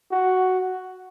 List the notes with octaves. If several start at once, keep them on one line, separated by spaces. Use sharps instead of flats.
F#4